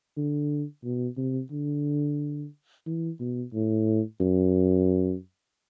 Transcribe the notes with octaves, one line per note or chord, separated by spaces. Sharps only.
D3
B2
C3
D3
E3
B2
A2
F#2